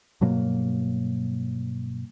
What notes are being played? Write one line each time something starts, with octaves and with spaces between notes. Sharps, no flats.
G2 B2 F#3 A#3